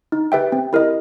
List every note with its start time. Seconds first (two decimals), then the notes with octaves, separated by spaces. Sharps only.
0.12 D#4
0.32 G4 B4 E5 G5
0.52 C4
0.73 E4 G4 A#4 D#5